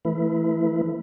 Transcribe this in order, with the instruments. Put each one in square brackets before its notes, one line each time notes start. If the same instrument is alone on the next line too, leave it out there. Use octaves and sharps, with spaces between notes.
[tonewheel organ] E3 A3 E4 B4